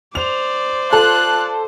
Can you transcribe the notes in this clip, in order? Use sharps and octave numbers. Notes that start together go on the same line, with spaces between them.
C5 D5 F7
F4 A4 F#6